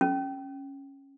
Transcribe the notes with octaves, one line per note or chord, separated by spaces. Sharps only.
C#4